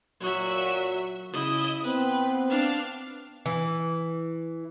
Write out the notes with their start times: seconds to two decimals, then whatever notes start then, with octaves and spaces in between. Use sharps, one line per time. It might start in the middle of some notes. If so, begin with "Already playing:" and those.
0.21 A#2 F#3 F#4 E5
1.33 C#3 E4 D#5
1.83 B3 C4 B4
2.50 D4 F5
3.46 E3